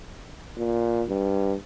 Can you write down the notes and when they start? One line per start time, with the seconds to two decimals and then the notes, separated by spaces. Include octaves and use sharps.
0.57 A#2
1.08 G2